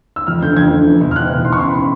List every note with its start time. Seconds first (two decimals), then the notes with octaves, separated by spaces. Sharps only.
0.16 E6
0.27 F2 F6
0.42 D3 G6
0.57 F2 G#6
0.71 D3
0.86 E2
1.01 B2
1.11 F6
1.16 E2 F#6
1.30 B2
1.45 E3 C6
1.53 C#6
1.59 C#3 C6
1.69 B5
1.74 C6